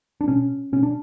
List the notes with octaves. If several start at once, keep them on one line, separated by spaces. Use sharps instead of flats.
D4
B2 C#4
B2 C#4
D4